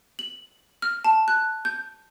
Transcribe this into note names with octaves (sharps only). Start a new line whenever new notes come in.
F#7
F6
A5
F#6
G6